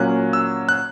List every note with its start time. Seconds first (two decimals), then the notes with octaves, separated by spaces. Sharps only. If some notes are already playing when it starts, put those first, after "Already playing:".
Already playing: A#2 F#3 A#3 C#4 F#6
0.33 E6
0.69 F#6